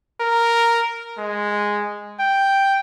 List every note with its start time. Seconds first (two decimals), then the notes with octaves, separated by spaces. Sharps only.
0.20 A#4
1.18 G#3
2.20 G5